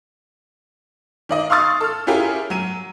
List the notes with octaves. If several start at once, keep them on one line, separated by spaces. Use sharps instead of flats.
D#3 D5 D#5
F5 C6 C#6 D#6 A6
A4 F6
C#4 E4 F4 G4 G#4 A#4
F#3 D#7